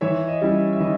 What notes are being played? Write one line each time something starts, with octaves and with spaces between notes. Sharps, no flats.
E3 C#5 E5
D#5
G3 C#4 E4
E5
E3 D#5